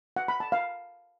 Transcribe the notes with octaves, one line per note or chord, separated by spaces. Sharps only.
F#5
B5
A5
F5